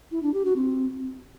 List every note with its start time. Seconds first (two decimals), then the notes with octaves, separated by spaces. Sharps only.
0.11 E4
0.23 D4
0.34 G4
0.45 F#4
0.56 C4